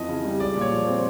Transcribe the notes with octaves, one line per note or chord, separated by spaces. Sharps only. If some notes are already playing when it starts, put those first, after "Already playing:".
Already playing: F2 E3 D#5
C#3
G3
G#3 D5
A#2
C#5
F3
C4